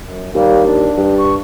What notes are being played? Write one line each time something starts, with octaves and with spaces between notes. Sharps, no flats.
F#2
D#2 G3 A#3
D4
G2
C#6